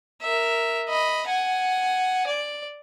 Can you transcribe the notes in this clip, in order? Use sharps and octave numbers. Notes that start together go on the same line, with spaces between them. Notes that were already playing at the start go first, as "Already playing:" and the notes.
A#4 E5
D#5 B5
F#5 G#5
D5